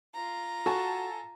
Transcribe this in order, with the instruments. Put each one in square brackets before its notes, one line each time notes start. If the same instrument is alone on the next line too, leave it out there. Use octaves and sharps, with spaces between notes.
[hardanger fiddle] F4 A#5
[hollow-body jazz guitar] F#4 [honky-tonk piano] A4 G#5 A5